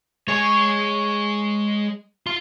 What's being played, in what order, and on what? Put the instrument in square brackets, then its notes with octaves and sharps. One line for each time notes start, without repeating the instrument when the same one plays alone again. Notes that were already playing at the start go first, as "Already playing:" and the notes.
[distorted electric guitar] G#3 G#4 [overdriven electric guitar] C#5
[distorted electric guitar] F4 C6